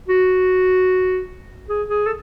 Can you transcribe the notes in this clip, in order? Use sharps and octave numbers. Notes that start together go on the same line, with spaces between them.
F#4
G#4
G#4
A4